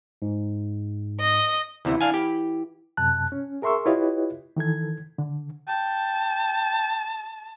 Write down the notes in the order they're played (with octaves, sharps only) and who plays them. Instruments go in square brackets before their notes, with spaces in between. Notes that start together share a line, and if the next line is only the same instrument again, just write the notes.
[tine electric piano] G#2
[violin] D#5 A#6
[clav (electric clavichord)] D2 C3 [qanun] E3 E4 F#5
[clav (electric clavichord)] D4 F5 G#5
[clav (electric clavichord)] G4 [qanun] B5
[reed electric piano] F#2 C3 A5 F#6
C#4
G#4 A#4 E5 C6 C#6 E6
E4 F4 G4 B4 C#5 D#5
D#3 E3 A4 G#6
D3
[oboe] G5 [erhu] A5